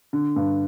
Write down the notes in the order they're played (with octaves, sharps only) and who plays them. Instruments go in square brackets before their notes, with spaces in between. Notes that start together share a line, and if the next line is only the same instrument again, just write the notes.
[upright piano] D3
G2